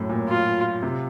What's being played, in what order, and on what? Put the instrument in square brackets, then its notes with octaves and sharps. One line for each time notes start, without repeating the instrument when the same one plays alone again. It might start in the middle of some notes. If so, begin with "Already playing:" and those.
Already playing: [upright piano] F#2 A2
A#2
[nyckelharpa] F4
[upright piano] C3